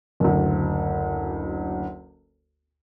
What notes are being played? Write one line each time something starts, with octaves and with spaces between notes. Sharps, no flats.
F#1 D2